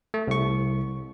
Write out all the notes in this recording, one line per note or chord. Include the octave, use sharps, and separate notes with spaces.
A3
C2 C#6